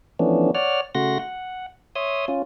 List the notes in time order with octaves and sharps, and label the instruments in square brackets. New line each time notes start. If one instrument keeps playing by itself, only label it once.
[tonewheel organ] E3 F3 A3 B3 C#4 D4
C#5 D5 F#5 F6
C#3 A3 F#4 F#5 C6 A#6
F#5
C#5 E5 C6 D#6
C#4 F4